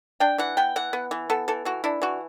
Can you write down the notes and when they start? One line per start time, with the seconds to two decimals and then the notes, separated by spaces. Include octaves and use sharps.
0.20 D4 G5
0.38 E3 F#5
0.57 B3 G5
0.76 E3 F#5
0.93 B3
1.11 E3
1.30 B3 A4
1.48 E3 A4
1.65 E3 F#4
1.84 D4 E4
2.02 E3 F#4